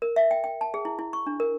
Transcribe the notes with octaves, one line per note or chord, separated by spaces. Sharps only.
A#4
E5
G5
G5
A5
G#4
E4
E4
C#6
D4
A#4